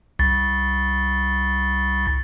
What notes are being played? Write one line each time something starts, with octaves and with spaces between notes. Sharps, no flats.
C2 A6